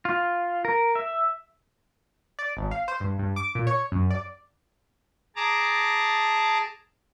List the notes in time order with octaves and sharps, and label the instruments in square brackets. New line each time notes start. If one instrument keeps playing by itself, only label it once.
[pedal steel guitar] F4
A#4
E5
[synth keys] D5
G#1
F5
C5
G2
G2
D6
A#2
C#5
F#2
D5
[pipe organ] G#4 A5 A#5 D6